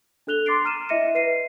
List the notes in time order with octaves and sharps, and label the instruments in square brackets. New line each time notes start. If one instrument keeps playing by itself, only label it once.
[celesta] D4 A4 F#6 F7 G7
C6 D6 A6 C7 D7
A#5 F6 D#7 E7
E4 D#5 E5 A#6 C#7 D#7
B4 C7 D#7